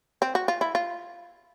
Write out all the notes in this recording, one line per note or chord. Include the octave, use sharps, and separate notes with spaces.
C4
F#4
F4
E4
F4